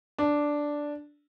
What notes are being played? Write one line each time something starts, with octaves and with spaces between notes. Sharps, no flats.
D4